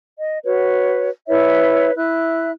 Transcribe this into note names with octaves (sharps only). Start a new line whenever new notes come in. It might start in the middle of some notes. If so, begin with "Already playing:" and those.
D#5
F#4 B4 C#5
E4 B4 C#5 E5
E4 E5 F#6